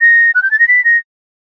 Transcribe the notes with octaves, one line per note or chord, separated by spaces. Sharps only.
A#6
F#6
G6
A6
A#6
B6
A#6